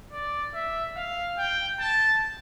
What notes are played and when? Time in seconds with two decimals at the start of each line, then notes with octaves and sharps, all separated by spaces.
0.13 D5
0.55 E5
0.96 F5
1.38 G5
1.80 A5